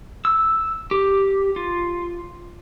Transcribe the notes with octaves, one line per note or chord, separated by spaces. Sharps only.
E6
G4
F4